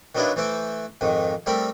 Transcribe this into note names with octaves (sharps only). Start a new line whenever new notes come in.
D#3 F#3 B3 D4 E4 F4
E3 A3 C5 E5 D6
F2 G#2 D#3
G3 A3 C4 A#4 B5